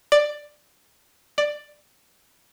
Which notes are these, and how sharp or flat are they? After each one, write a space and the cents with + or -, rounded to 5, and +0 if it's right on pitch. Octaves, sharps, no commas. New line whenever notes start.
D5 +10
D5 +10